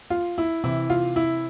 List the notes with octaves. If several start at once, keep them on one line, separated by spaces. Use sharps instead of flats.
F4
E4
C3 E3 E4
F4
E4